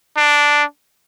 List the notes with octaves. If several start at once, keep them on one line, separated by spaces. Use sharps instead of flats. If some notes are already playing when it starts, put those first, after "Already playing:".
D4